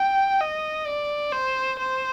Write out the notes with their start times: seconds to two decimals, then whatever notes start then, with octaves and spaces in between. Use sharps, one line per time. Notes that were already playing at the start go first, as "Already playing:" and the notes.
Already playing: G5
0.41 D#5
0.86 D5
1.32 C5
1.79 C5